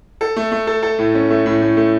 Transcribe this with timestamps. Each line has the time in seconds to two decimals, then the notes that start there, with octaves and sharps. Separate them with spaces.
0.21 A4
0.36 A3
0.52 A3
0.67 A4
0.83 A4
0.99 A2
1.14 C#4
1.30 A3
1.46 A2
1.62 A2
1.77 A3